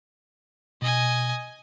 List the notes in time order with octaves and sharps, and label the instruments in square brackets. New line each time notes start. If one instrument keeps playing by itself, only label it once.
[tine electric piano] B2 [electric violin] D#5 G#5